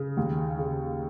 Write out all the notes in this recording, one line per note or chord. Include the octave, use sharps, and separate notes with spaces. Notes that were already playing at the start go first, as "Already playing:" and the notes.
Already playing: C#3
D#2
C#3